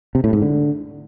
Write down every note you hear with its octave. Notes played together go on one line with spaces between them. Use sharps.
C3
A2
G#2
D3